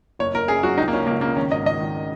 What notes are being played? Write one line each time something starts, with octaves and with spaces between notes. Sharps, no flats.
F#1 C#5
F#1 A#4
F#2 G#4
F#3 F#4
C#2 D#4
A#3
C#3 C#4
C#2 A#3
C#3 A#3
D#3 C#4
G#1 D#5
D#3 D#5
D#3